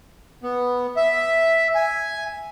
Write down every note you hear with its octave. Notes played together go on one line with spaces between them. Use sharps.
B3
E5
G#5